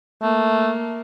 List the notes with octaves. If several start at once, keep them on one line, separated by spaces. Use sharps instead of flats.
A3 A#3